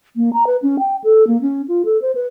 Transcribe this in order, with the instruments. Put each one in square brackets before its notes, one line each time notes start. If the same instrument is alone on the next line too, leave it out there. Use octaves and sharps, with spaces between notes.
[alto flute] A#3
A#5
B4
C#4
G5
A4
A#3
C#4
F4
A4
C5
B4